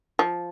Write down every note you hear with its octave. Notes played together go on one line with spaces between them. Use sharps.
F3